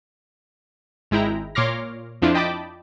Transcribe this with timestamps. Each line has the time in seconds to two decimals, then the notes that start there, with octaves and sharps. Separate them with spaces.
1.11 G#1 G#3 E4 G5 A#5
1.55 A#2 C#5 C6 D6 F6 A#6
2.22 F2 F3 D4 E4 F4
2.35 D#5 G5 A5 B5 D6